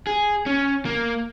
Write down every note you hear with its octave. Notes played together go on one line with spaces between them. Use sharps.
G#4
C#4
A#3